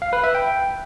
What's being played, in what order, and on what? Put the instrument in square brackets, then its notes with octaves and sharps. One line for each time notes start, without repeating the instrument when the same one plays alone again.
[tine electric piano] F5
B4
E5
G5